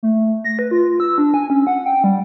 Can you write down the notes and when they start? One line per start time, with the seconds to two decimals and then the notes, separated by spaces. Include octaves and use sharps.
0.03 A3
0.45 A#6
0.59 B4
0.71 F4
1.00 E6
1.18 D4
1.34 G#5
1.50 C#4
1.67 F#5
1.86 G5
2.04 G3